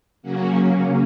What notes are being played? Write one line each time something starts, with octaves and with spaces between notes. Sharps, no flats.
C#3 F#3 A#3 C#4 F#4